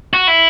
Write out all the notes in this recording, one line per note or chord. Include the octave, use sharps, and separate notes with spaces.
F#4
E4